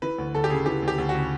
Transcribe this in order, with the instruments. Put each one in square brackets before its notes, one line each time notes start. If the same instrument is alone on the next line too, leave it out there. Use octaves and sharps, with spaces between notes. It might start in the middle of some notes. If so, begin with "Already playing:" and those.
[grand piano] E3 B4
D2
D2 A4
G4
C#3 G#4
E3 G4
D2
G4
D2
F#4
C#3